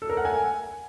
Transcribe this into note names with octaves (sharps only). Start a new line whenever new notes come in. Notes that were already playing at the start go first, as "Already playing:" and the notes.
A4
A#4
F#5
G#5